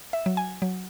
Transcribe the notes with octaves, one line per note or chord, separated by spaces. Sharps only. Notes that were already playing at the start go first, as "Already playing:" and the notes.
E5
F#3
G#5
F#3